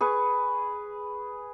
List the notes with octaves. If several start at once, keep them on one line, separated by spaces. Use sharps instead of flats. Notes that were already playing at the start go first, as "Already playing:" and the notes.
G#4 B4 C#6